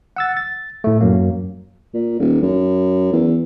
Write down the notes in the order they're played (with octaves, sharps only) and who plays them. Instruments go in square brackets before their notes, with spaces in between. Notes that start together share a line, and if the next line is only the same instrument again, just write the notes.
[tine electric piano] F#5 E6 A6
A6
A2 A3
F#2 F#3 A#3
[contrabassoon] A#2
D#1
F#2
E2